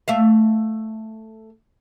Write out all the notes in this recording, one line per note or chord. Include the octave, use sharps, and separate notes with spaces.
A3 E5 F5